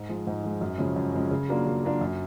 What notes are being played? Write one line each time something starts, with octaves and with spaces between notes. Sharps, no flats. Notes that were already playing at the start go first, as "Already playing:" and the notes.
Already playing: G#2
F3 G#3
G#2
F3 G#3
F#2
C#3 F3 G#3 C#4
F#2
C#3 F3 G#3 C#4
C#3
F#3 A#3 D4 F4
C#3
F#3 A#3 D4 F4
F#2